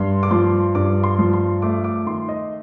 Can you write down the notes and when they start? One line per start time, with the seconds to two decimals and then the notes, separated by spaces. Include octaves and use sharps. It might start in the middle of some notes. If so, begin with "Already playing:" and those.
Already playing: G2 C6
0.23 D6
0.31 F3 C6
0.75 G2 D6
1.03 C6
1.19 F3
1.33 C6
1.62 A3 D6
1.84 D6
2.06 D#3 C6
2.29 D#5